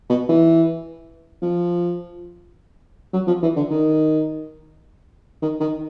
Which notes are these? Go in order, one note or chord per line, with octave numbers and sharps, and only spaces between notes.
B2
E3
F3
F#3
F3
E3
D3
D#3
D#3
D#3